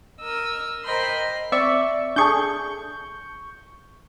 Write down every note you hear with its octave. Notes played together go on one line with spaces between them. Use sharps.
A#4 D#5 E6
A#4 C5 D#5 G5 B5 C6
C4 D5 E5 C#6
D4 G#4 A4 C#6 G6